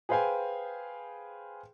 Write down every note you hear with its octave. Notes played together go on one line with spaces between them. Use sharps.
G#4 B4 C5 F5 G5 G#5